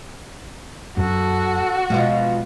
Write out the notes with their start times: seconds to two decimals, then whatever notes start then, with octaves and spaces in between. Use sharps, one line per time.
0.97 F#2 F#4 A4
1.90 B2 F3 G#3 F5